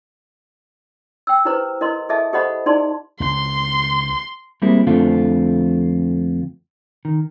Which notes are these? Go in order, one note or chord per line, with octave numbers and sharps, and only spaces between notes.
G5 E6
E4 G4 G#4 B4 C5 A#5
E4 A#4 D#5 C6
G#4 A4 D#5 E5 A5
G4 A4 C5 D#5 F#5 B5
D#4 E4 G#4 D5 A5 C6
C#2 C6
G3 G#3 A#3 C4 E4
F2 D3 F3 A3 C4 F4
D#3